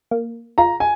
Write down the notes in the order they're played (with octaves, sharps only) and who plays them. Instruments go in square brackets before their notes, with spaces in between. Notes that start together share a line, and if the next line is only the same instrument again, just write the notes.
[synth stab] A#3
[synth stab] F4 [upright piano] A#5
[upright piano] G#5